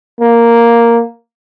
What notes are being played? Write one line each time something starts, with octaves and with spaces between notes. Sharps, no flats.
A#3